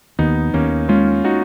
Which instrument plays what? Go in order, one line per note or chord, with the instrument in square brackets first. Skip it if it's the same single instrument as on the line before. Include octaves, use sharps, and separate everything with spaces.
[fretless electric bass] D#2 [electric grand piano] B3 D#4
[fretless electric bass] D#2 [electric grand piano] A#3 C#4
[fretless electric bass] G#3 [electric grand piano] C#4 F4
[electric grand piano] D#4 F#4